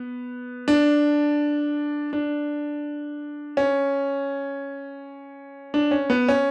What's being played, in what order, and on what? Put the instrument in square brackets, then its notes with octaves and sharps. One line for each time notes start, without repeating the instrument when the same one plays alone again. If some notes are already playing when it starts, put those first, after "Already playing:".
Already playing: [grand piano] B3
D4
D4
C#4
D4
C#4
B3
C#4